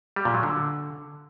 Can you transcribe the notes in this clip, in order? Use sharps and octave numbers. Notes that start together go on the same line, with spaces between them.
G3
A#2
F#3
D3